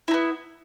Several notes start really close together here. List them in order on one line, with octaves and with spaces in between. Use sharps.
E4 D#4 B3